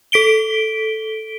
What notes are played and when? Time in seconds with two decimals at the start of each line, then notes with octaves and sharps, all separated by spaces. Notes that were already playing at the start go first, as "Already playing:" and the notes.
0.12 A4 B6 D7 G7